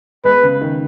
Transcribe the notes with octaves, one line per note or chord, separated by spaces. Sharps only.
G#3 B3 B4
C#3
D#3